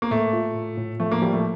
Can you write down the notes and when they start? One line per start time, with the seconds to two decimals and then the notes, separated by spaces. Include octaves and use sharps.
0.02 A#3
0.11 A2 A3
0.33 F4
0.55 A2
0.77 A2
1.00 F3 A3
1.12 A#3
1.22 F3 G3
1.33 A3